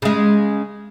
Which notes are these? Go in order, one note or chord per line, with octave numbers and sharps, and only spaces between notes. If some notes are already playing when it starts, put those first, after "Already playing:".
C#3 G#3